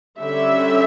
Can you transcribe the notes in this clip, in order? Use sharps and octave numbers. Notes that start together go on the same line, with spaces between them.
D3 G3 C#4 E5